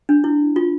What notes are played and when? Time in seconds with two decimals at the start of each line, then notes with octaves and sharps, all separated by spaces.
0.09 D4
0.24 E4
0.56 F4